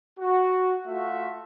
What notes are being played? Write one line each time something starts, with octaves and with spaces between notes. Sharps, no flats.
F#4
A3 F4 F#4 E5